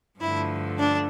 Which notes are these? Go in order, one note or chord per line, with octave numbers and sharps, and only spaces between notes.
G2 D3 F3 A3 E4
D4